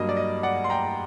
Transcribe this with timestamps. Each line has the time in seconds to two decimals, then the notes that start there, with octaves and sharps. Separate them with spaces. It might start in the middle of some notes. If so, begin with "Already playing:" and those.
Already playing: G2 F#3 A#3 D#5
0.09 D5
0.17 D#5
0.43 D5 F#5
0.64 C6
0.70 G5 A#5